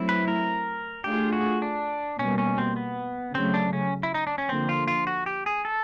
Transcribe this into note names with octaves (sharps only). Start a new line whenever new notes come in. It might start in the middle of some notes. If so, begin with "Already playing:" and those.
Already playing: F#3 A3 C4 E4
B4
A#4
A3 D4 F4 G4 G#4
F#4
D4
B2 G3 A#3 C#4
C#4
C4
B3
C#3 F#3 A3 C4
D4
C#4
E4
D#4
D4
C#4
D3 F3 A#3 C4
F4
F4
F#4
G4
G#4
A4